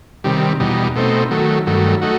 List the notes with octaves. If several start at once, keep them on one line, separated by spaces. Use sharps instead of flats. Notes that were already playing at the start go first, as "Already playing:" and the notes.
C3 D#3 G3
E2 B2 G3 D#4
B2 A3 C4 D#4
D#3 F#3 A3
G2 D#3 F#3 A3
A3 D#4 F#4